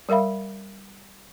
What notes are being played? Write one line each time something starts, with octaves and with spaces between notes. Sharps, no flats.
G3 A#4 E5 F5 B5